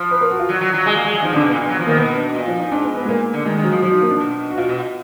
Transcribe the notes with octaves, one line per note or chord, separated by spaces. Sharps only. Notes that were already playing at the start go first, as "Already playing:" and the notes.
Already playing: F3
B4
A#4
F#4
F4
F#3
F#3
F#3
G#3
A#3
G#3
F#3
F3 D#4
D3 D4
B2
A#2 B3
A#2
F#3
F3
D#3 A#3
B2 B3
D4
A#2
F3
D#4
G#2 D4
B3
B3
G#3
A#2 A#3
D3
D#3 G#3
D#3
F#3
F3
F3 F#3
D#4
A#3
D4
B2
F#4
B2 F4
B2